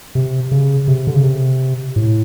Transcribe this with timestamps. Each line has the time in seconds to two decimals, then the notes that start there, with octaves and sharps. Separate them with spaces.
0.15 C3
0.51 C#3
0.88 C3
1.07 D3
1.15 C#3
1.23 C3
1.96 A2